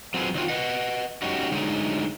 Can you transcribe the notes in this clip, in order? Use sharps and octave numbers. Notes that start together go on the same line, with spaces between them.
F#3 C4 F4 G4 G#4 B4
D#3 F#3 C4 C#4 F4 F#4
B4 D#5 F#5
G3 C#4 D#4 F#4
D3 F#3 G#3 A3 D#4